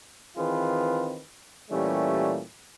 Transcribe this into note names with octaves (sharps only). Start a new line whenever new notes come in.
D#3 E3 C4 F4 G#4 B4
A#2 E3 G3 A3 C#4 G4